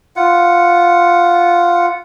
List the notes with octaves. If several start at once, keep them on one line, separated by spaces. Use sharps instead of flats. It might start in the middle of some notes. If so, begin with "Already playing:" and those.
F4 F#5